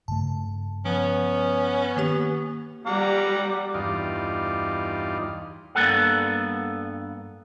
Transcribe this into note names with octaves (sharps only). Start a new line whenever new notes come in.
G2 C#3 A3 A5
F3 B3 C#4
D#3 A#3 G4
G3 F#5 A#5 D6
E2 G2 D#4 F4 D5
G2 A#3 B3 A4 F#5